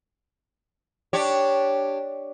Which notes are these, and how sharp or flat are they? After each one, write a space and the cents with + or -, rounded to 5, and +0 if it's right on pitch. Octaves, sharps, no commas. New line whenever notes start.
D4 +0 G4 +0 C#5 +0